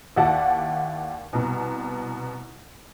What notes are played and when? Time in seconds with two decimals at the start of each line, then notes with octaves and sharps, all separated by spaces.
0.16 D#2 E4 G4 D5 F#5 A5
1.33 C2 B2